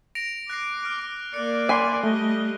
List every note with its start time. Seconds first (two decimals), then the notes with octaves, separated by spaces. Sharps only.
0.15 A#6 D7 F7
0.50 D6 F#6 A#6 C7
0.85 F6
1.34 A#3 D5 F#6 C#7
1.69 G#5 B5 C6 D6
2.04 G3 A3 D#5